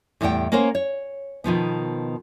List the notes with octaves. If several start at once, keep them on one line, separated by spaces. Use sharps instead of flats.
E2 A2 G3 F#5 G5
A#3 C#4 A#4 C5 C#5 F#5
C#5
B2 D#3 F3 B3